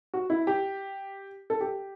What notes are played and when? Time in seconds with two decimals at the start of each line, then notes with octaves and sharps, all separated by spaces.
0.14 F#4
0.30 E4
0.47 G4
1.50 A4
1.61 G4